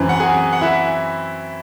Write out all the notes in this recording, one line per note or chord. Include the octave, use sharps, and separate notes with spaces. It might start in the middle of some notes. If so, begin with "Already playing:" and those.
Already playing: F#2 E3 C4
F#5
G#4 G#5
F#5
E4 E5